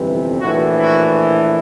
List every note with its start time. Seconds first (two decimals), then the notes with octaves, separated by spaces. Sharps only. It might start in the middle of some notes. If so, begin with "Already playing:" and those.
Already playing: G1 F2 C3 E3
0.41 A#1 A2 E3 E4 F#4
0.79 E4 F#4